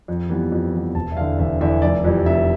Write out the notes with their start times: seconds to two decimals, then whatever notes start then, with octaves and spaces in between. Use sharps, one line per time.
0.08 F2
0.29 E3 G3 B3
0.52 F2
0.73 E3 G3 B3
0.95 E1 A5
1.12 E5
1.17 E2 D3 F5
1.39 E1 E5
1.61 E2 D3 E5
1.82 F1 D5
2.04 F2 E3 G3
2.26 F1 E5